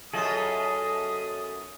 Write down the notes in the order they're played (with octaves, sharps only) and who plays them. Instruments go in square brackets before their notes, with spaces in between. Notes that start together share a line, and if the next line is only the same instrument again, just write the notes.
[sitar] F#2 F4 [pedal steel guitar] G#4 A4 D#5 [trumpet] D#6